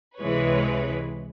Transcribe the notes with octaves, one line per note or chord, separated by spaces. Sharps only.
C#2 C3 E3 G#3 B4 C#5